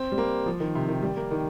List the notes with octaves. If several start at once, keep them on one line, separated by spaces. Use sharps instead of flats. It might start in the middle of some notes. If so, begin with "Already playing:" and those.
Already playing: C4
G3
A#3
F3
D#3
C3
D#3
G3
A#3
D#3